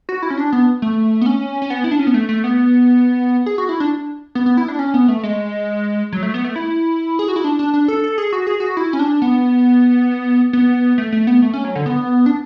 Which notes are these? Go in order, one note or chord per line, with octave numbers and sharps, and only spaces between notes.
F#4
E4
C#4
D4
B3
A3
B3
C#4
C#4
B3
E4
D4
C#4
B3
A3
A3
B3
G#4
F#4
E4
D4
B3
B3
E4
D4
C#4
B3
A3
G#3
F#3
A3
B3
A3
E4
G#4
F#4
E4
D4
D4
D4
A4
A4
G#4
F#4
G#4
F#4
E4
C#4
D4
B3
B3
A3
A3
B3
A3
C#4
F#3
D3
B3
D4